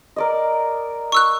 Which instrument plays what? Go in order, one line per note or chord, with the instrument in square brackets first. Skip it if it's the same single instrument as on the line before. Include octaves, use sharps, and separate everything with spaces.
[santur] A#4 D5 D#5
[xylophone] C#6 E6 F#6